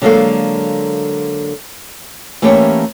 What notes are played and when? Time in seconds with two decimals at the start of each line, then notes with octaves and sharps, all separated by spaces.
0.02 D3 F#3 G#3 A#3 A4 F5
2.42 E3 A3 A#3 C#4 G4 C#5